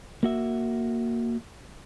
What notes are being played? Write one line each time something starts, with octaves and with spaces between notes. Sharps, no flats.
A#3 F#4 E5